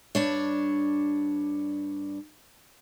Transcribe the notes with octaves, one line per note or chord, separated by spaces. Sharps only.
G2 D4 C#5